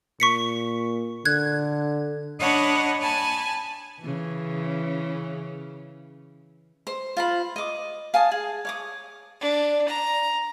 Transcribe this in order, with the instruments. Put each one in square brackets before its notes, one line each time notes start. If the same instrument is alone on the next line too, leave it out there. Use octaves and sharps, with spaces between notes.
[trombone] A#2 [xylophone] C#6 B6 C#7
[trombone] D3 [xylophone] F#6 G#6
[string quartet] D4 C#5 D#5 F#5 A5 B5
G#5 A5 B5
[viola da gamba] C#3 E3
[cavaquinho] C5
F4 C5 B5
D#5 D6
F5 G#5 A5 D#6
G#4
C#5 D6 D#6
[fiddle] D4
A#5